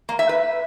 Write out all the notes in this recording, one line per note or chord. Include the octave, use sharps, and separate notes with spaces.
A#3
E5
B4